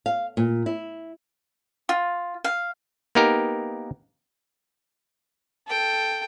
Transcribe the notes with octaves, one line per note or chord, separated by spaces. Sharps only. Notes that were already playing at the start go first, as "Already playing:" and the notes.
F5
A#2
E4
F4
F5
A#3 B3 D#4 G4 A#4
A4 G5